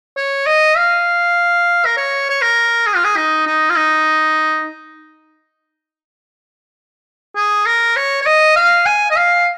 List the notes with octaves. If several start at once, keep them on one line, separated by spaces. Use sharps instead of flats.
C#5
D#5
F5
A#4
C#5
C#5
A#4
G#4
F4
G#4
D#4
D#4
F4
D#4
G#4
A#4
C#5
C#5
D#5
F5
G#5
D#5
F5